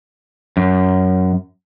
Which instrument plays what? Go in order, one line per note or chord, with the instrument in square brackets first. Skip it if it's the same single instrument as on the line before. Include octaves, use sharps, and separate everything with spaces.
[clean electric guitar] F#2